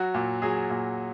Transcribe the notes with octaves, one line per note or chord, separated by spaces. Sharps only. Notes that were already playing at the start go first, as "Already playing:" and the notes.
Already playing: F#3 F#4
A#2
F#3 G#4
A#2